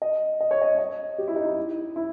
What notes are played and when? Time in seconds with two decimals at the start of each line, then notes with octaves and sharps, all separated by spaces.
0.02 D#5
0.41 D#5
0.51 C#5
0.62 D#5
0.78 D#5
1.18 G4
1.28 E4
1.36 D#4
1.46 E4
1.96 E4